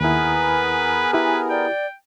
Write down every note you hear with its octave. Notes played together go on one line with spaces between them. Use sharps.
D#2 B3 E4 G#4 A#4 B4 G#5
E4 G4 B4
D5 G5